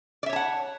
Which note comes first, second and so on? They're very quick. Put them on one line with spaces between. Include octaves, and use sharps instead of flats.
D5 E5 C#5 A5 F#5